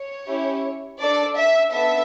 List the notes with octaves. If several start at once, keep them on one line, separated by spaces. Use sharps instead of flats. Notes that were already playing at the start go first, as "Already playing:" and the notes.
Already playing: C#5
C#4 E4 G4
D4 A4 D5
E5
B3 D4 A4 E5